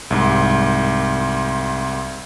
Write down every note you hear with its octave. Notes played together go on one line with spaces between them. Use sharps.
C2 G#2 D6